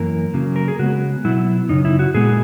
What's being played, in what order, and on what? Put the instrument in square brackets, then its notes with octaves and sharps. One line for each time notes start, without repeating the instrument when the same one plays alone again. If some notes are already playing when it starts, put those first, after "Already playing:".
Already playing: [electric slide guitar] F#2 E3 A#3 A#4
C#3 F#3 A#3
A#4
G#4
C#3 G#3 B3 F#4
B2 F#3 B3 E4
F#2 C#3 D#4
E4
F#4
A#2 G#3 B3 G#4